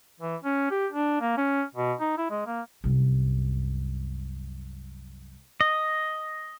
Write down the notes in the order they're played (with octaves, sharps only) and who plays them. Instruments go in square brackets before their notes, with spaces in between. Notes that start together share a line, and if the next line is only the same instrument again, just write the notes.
[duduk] E3
C#4
G4
D4
A#3
C#4
B2
D#4
E4
G#3
A#3
[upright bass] C2 F#2
[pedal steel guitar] D#5